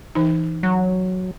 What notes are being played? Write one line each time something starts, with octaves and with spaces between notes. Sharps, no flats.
E3 D#4
F#3